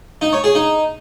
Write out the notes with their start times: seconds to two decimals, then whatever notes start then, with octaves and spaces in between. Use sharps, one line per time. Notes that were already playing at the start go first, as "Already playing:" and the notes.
0.21 D#4
0.33 C#5
0.44 G#4
0.55 D#4